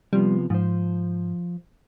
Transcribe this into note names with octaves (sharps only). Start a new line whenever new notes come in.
C3 F3 G3 B3
G#2 F3 C5